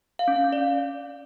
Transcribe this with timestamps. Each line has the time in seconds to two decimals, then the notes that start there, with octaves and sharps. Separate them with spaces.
0.19 F5
0.28 C#4
0.36 F5
0.44 C#4
0.53 D5